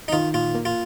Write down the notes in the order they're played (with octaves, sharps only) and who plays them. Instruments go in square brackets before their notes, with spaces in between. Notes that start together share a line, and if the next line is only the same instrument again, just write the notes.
[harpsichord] D#4
[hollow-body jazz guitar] D#3 [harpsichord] F4
[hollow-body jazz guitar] A#2 [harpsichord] F4
[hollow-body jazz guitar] A#3
[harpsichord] F4